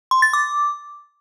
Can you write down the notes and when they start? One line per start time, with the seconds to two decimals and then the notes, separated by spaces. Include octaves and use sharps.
0.11 C6
0.22 A6
0.33 D6